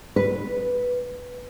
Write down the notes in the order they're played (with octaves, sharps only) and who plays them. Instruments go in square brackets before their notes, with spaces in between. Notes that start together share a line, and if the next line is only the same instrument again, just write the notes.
[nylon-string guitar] B4